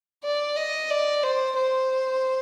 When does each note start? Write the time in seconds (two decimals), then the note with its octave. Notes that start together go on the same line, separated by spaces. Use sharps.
0.24 D5
0.56 D#5
0.90 D5
1.23 C5
1.55 C5